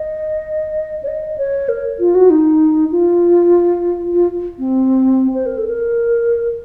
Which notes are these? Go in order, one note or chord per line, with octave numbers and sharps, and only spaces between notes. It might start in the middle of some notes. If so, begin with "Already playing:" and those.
Already playing: D#5
C#5
D#5
C#5
A#4
F4
F#4
D#4
F4
F4
C4
C5
A#4
A4
A#4